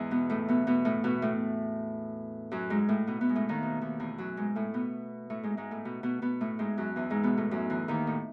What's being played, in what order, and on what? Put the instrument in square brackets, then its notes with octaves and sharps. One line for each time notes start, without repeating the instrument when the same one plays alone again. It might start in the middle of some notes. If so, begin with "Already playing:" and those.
Already playing: [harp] E2 G#2 E3 G#3
B2 B3
A2 A3
B2 B3
B2 B3
A2 A3
B2 B3
A2 A3
F#2 F#3
G#2 G#3
A2 A3
B2 B3
B2 B3
G#3
A2 A3
D#2 D#3
B2
D#2 D#3
E2 E3
F#2 F#3
G#2 G#3
A2 A3
B2 B3
A2 A3
G#2 G#3
G#2 G#3
A2 A3
B2 B3
B2 B3
B2 B3
A2 A3
G#2 G#3
F#2 F#3
E2 E3
G#2 G#3
B2 B3
A2 A3
F#2 F#3
E2 E3
D#2 D#3
A2